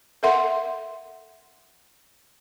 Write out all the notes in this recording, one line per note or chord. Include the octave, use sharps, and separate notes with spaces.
A4 A#4 E5 F#5 C6